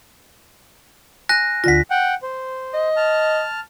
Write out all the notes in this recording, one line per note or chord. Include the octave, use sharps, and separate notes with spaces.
G#5 F#6 A#6
D2 D3 F4 A#6 B6
F#5 G5
C5
D#5
A5 F6